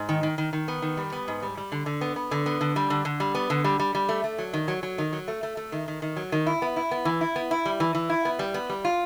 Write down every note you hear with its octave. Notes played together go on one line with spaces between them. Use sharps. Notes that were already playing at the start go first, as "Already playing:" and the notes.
Already playing: G#2
D#3
D#3
D#3
D#3
B3
D#3
G3
B3
G#2
G3
G3
D3
D3
B3
B3
D3
B3
D3
G3
D3
D3
G3
B3
D3
G3
G3
G3
A3
A3
F#3
D#3
F#3
F#3
D#3
F#3
A3
A3
A3
D#3
D#3
D#3
F#3
D#3
E4
B3
E4
B3
E3
E4
B3
E4
G3
E3
E3
E4
B3
G3
B3
G3
F4